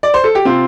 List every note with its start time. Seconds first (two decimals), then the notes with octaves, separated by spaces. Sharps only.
0.03 D5
0.14 C5
0.24 A4
0.35 G4
0.45 C3 C4 F4